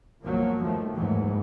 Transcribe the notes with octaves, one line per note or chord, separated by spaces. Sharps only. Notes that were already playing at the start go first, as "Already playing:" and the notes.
G1 C2 F3 F#3 A#3
D#2 D#3 F3 A3
D#2 G#2 E3 F#3